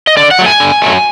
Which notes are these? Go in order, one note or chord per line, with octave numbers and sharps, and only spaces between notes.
D#5
D3 D5
F#5
F#3 A3
G#5
D3
F#3 A3